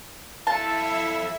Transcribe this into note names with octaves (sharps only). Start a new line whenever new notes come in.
E4 F4 A4 E5 A5